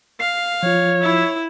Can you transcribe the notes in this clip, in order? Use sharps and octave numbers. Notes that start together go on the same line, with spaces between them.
F5 C7
F3 F4 C#5
E4 E5